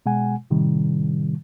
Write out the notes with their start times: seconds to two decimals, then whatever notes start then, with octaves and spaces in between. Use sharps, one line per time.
0.06 B2 G#3 F#5 G#5
0.50 A2 C3 D#3 G3